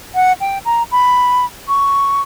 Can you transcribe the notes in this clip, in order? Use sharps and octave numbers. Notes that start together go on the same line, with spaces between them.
F#5
G5
A#5
B5
C#6